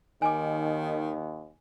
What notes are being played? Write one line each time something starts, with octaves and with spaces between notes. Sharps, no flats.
D#2 D#3 G#5 D6